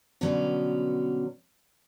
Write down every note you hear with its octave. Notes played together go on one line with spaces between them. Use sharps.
B2 D3 F#3 G3 B3 C#4